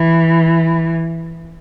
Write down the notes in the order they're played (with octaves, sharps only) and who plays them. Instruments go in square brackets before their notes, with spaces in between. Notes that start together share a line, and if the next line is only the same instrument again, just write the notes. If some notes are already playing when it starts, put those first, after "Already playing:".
Already playing: [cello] E3